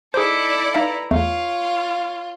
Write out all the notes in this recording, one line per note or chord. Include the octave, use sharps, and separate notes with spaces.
D#4 E4 G#4 A4 C5 D5 D6
D#4 B4 E5 F5 A#5
E2 A3 F4 C#5 F5